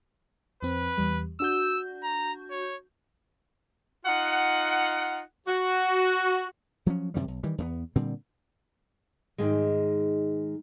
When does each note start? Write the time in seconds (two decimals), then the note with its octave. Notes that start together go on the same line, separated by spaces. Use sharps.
0.63 F2 C4 B4
0.98 E2 G3
1.40 D4 F#4 E6 G6
2.04 A#5
2.51 C#5
4.06 D#4 F4 F#5
5.48 F#4
6.86 F3 F#3 C4 C#4
7.14 F#2 C3 D#3 G3
7.28 B1
7.43 D#3 E3 G3
7.58 E2 A3 B3
7.96 A#2 D3 G3 C4
9.38 G#2 D#3 G#3